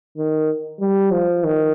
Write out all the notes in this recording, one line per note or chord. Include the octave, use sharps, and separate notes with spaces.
D#3
G3
F3
D#3